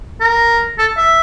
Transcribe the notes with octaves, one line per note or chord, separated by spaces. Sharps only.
A#4
A4
E5